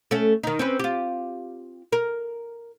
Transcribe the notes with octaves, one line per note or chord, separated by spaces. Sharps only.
A3 C#4
D#3 D#4
C4 C#4 B4
F4 G4
A#4